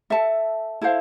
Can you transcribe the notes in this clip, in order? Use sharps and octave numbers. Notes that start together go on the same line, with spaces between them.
A4 E5 A5
E4 A4 C5 F5